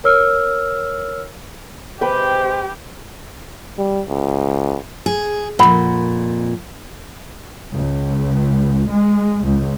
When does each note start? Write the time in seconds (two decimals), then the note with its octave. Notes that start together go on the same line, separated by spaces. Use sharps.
0.04 A#4 C#5 E6 F6
2.01 C3 G#3 G4 B4 C5 G5
3.79 G3
4.08 C#2
5.06 G#4
5.59 F2 A#2 A#4 F#5 B5
7.72 C#2
8.90 G#3
9.45 C#2